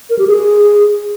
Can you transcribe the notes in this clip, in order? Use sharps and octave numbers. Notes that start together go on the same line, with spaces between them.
A#4
G4
G#4